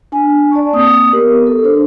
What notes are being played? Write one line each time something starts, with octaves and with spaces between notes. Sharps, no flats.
D4 G#5
D5 A5 C#6
A#3 C4 D#6
B3 G4 A#4
A4
D4 C5